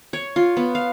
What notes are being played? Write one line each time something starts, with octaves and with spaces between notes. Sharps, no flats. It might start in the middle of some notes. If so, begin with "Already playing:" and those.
C#5
F4
B3
F5